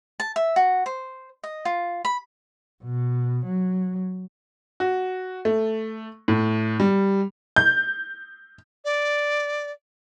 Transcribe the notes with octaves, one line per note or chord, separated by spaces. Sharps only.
A5
E5
F#4
C5
D#5
F4
B5
B2
F#3
F#4
A3
A2
G3
G6
D5